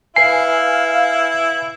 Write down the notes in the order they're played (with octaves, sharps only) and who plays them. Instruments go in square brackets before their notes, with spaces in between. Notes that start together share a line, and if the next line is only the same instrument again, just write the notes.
[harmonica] E4 [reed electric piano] B4 G#5 [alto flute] F5 [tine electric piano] C7